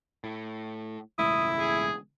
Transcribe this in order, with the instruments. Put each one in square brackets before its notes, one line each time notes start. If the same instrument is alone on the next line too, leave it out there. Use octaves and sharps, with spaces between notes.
[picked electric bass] A2
[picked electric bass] E1 C#2 A2 [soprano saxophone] E4 [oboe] D#6
[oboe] G#4